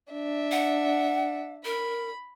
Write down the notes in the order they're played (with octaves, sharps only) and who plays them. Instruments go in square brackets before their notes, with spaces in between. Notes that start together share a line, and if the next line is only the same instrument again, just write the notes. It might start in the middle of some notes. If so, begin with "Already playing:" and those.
[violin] D4 E5
[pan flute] F#5
[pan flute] A#4 [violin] B5